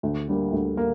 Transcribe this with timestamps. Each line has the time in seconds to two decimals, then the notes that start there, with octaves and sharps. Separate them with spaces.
0.03 D2
0.28 D3 G3 A#3
0.52 D2
0.77 A#3